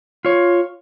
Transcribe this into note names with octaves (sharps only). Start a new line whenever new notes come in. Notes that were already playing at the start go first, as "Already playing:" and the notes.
F4 C#5